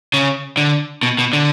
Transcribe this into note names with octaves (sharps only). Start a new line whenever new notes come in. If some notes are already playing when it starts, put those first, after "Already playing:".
C#3
D3
B2
B2
D3